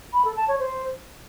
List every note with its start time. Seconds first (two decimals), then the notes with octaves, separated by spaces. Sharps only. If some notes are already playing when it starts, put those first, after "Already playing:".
0.13 B5
0.24 A4
0.36 A5
0.48 C#5
0.59 C5